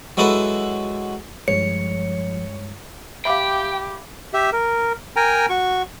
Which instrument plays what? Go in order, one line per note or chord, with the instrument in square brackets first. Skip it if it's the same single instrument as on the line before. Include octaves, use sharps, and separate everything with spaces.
[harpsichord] F#3 G#3 E4 F#4 A4 B4
[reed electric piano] G2 G#3 [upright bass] F3 [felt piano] C#5 [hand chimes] C#7
[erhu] G4 [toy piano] E5 F5 [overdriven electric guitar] G5 [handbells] B5 D6
[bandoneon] G4 E5
A#4
A#4 G5 G#5 A#5
F#4 C#6